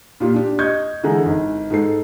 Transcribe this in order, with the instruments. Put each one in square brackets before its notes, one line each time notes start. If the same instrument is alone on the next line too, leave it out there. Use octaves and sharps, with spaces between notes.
[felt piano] A#2 F4 G4
D4 G4
D#5 C#6 G6 G#6
D3 E3 G#3 A#5
G#1
G#2 A4 C7